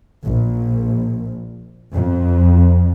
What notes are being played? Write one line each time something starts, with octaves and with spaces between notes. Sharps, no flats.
A#1
F2